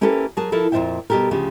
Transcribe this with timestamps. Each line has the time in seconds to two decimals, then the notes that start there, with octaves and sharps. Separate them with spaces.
0.01 A#3 C#4 E4 G4 A4 B4
0.37 F#3 G#4 A#4 A5
0.52 F3 E4 A4 A#4
0.72 F2 A#2 F3 C5 E5 G5
1.10 B2 G3 G4 A4 A#4
1.31 D2 C#3 F3 G4